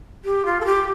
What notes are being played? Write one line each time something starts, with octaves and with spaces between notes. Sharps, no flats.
G4
F4
A4
G4